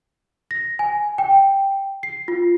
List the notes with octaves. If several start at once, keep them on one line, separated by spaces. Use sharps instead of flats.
A#6
G#5
G5
C7
F4